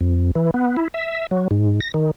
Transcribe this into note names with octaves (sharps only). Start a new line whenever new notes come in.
F2
E3
B3
E4
E5
F#3
G#2
A#6
D#3